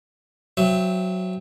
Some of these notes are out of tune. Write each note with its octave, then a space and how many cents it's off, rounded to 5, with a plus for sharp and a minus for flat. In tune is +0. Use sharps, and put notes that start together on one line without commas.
F#3 +0 C4 +0 E5 +25